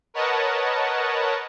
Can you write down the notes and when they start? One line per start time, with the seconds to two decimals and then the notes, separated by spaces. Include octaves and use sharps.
0.14 A#4 B4 C#5 D#5 F#5 A5